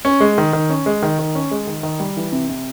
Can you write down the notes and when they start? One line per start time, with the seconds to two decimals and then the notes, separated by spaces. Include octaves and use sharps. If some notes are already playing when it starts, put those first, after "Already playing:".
0.05 C#4
0.20 G#3
0.38 D#3
0.53 D#3
0.70 C#4
0.86 G#3
1.03 D#3
1.19 D#3
1.35 C#4
1.51 G#3
1.67 D#3
1.83 D#3
2.00 G3
2.17 E3
2.32 C3
2.49 C3